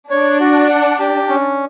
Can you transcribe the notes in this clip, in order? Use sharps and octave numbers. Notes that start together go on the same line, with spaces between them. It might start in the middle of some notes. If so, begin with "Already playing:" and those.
D4 C#5
F#4
F#5
G4
C#4